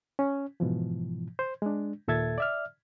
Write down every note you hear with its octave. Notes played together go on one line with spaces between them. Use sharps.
C#4
G#2 B2 E3 F3
C5
G#3 D4
D#2 A#2 A4 E5 G#6 A6
D5 E5 F6